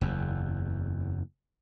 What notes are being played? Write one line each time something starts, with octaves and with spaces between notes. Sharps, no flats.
F#1 E2